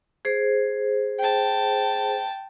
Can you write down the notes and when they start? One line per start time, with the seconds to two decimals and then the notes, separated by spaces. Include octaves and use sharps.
0.25 G#4 C5
1.19 G5 A5